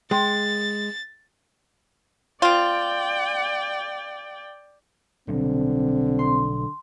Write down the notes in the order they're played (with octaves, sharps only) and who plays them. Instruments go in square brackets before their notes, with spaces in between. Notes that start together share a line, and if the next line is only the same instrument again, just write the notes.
[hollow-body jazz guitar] G#3 [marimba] G5 C6 [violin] A6
[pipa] C4 F4 [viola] D5 G5
[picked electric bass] B2 F#3 G3 [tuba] D3 [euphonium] C4
[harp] C6